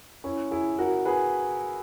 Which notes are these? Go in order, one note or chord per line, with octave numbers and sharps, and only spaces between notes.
C#4 E4
E4 G#4
F#4 A#4
G#4 B4